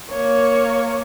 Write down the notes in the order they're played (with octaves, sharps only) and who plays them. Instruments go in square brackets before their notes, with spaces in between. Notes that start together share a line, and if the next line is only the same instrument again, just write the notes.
[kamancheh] A#3 C#5